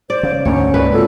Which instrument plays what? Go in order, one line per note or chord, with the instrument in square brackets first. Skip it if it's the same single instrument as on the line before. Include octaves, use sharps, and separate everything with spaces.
[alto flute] C5 [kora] D5
[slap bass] C#3
[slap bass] D2 G#2 D3 [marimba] A#3 [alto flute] C#4 [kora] C#5
[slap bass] C#2 G#2 [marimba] A#4 D5 [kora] B4
[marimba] C4 F4 F#4 [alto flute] A4